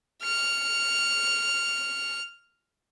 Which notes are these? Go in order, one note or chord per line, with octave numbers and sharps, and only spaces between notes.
F6 C#7